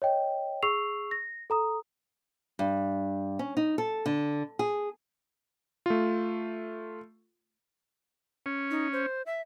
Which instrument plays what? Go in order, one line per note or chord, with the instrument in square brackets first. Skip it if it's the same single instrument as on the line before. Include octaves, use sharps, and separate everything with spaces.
[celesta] C#5 D#5 G5
G#4 C#6 E6 C7 F7
A#6
A4 A#5 D#6
[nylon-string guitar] G2
C#4
D#4
A4
D3
G#4
[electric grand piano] A3 F4
[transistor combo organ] C#4
[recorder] D#4
C5
E5